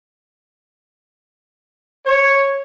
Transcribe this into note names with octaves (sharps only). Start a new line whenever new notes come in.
C#5